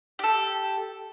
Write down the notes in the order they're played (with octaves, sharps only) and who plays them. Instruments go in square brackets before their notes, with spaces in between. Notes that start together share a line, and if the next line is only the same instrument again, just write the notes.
[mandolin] G4 A4